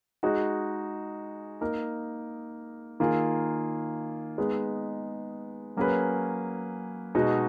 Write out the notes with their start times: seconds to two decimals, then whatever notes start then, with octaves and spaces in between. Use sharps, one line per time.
0.23 G#3 D#4 F#4
1.61 A#3 D#4 A#4
3.00 D#3 A#3 F4 G#4
4.38 G#3 B3 D#4
5.77 F#3 A#3 C#4 G#4 B4
7.15 B2 G#3 D#4 F#4